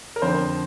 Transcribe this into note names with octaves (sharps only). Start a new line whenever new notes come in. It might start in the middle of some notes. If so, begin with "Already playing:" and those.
A#4
F2 D3 F3 C5